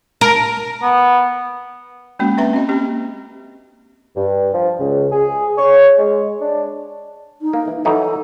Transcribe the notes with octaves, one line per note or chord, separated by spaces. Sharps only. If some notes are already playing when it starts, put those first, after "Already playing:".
A#4
B3
G#3 A#3 C#4 F#4
C4 D4 B4 E5 A#5
C4 C#4 F#4 D#5
A#3 C4 C#4 G4
G2
F3
C#2
G#4
C#5
G#3
D4
D#4
A#3
E3
E3 F#3 D#4 A4